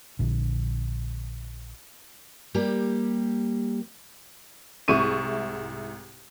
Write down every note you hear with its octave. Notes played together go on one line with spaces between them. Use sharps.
A#1 D3
G3 A#3 G4
C2 G#2 E4 C#6 D#7